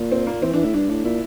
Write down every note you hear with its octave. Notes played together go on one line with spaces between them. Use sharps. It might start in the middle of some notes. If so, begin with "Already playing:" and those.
Already playing: A#2
C4
A#3
E3 C4
E3 D4
A2 E4
G2 D4
A2 D4
A#2 E4